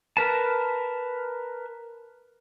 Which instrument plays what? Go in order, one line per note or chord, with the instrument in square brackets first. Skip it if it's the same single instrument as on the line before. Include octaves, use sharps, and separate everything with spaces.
[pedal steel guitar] A#4 B4 A5